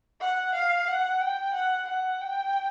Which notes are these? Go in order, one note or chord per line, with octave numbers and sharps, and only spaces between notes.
F#5
F5
F#5
G5
F#5
F#5
G5